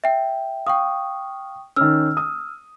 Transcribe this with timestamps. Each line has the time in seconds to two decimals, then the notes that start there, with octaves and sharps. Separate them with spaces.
0.04 E5 G5
0.66 F5 G5 C#6 D#6
1.76 D#3 C#4 E6 F6
2.17 D#6